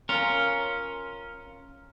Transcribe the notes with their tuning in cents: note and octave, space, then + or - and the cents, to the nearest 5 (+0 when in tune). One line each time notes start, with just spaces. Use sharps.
C#4 +0 F4 +0 A#4 +0